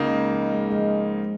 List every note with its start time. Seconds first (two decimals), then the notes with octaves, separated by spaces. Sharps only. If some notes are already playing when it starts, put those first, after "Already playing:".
Already playing: C#2 C#3 A#3 D#4
0.10 G#3
0.33 F3
0.53 G#3
0.71 G#3
0.78 F3